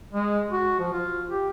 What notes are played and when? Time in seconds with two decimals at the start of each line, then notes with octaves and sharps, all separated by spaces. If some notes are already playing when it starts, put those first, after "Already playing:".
0.14 G#3
0.51 F#4
0.80 F3
0.93 F4
1.28 G4